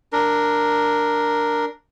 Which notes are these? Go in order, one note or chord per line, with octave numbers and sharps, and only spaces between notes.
D4 A#4